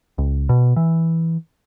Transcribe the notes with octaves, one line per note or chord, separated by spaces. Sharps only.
C#2
B2
E3